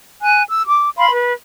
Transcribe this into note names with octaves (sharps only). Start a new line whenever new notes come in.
G#5 F#6
E6
D6
F5 B5 C6
B4